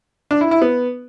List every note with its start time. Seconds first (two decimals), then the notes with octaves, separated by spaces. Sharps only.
0.31 D4
0.41 E4
0.51 E4
0.62 B3